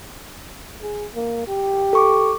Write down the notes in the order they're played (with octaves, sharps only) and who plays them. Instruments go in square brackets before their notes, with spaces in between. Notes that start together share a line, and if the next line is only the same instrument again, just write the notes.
[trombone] G#4
A#3
G4
[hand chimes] A4 C#6 D6